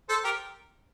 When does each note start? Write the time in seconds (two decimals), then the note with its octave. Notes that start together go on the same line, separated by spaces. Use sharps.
0.09 A4 C5
0.24 G4 A#4